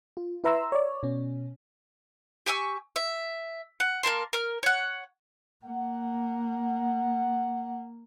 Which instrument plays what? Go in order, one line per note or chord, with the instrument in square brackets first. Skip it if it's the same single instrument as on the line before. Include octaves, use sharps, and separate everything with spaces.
[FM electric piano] F4
E4 B4 E5 A#5 C6 E6
C#5 D5
B2 C#4
[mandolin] G4 G#5 C#6 E6
E5
F#5
A#3 A#4 A5 C6
A#4 F6
C#5 F#5
[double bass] A#3 [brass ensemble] F#5